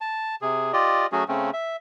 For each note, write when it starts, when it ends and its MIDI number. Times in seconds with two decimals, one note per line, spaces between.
0.01 0.35 81
0.42 0.72 48
0.42 0.72 68
0.73 1.06 65
0.73 1.06 67
0.73 1.06 74
0.73 1.06 75
1.12 1.24 54
1.12 1.24 57
1.12 1.24 61
1.12 1.24 66
1.12 1.24 68
1.28 1.50 49
1.28 1.50 57
1.28 1.50 60
1.28 1.50 61
1.53 1.76 76